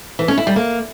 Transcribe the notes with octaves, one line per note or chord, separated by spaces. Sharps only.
E3
C#4
E4
G3
A#3